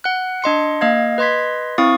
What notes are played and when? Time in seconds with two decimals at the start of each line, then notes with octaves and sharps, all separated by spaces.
0.04 F#5 F#6
0.42 D4 D#5 C6 C#7
0.81 A#3 D#5 F5 G#6
1.18 B4 D#5 C6 G#6 B6
1.78 C4 E4 F5 C#6 D#6